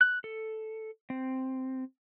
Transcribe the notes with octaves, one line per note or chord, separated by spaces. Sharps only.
F#6
A4
C4